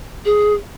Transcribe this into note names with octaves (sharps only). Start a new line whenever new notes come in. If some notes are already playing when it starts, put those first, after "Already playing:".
G#4